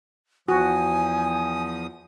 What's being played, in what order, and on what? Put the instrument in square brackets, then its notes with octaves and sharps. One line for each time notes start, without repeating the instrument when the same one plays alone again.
[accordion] E2 F3 D#6 [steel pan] F#4 [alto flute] G#5